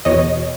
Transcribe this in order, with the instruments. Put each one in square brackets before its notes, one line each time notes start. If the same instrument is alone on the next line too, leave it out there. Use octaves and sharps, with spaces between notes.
[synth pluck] E2 B2 C#5 D#5